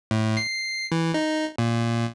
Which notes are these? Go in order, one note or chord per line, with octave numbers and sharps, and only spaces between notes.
A2
C7
E3
D#4
A#2